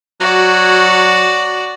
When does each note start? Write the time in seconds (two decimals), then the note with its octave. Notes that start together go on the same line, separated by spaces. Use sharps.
0.20 F#3 F#4 D5